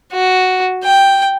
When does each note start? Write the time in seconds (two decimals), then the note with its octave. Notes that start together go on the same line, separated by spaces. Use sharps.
0.13 F#4
0.84 G5